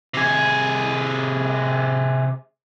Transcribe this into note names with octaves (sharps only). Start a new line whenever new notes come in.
C3 G#4